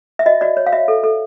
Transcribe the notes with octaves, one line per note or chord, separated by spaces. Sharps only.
E5
F#4 D#5
F#4 D5
C#5
F5
F#4 E5
A4
A4